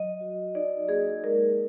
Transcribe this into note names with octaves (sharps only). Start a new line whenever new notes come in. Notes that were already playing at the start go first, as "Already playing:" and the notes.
Already playing: F#3 D#5
F#4
D#4 D5
A#3 G#4
G#3 A#4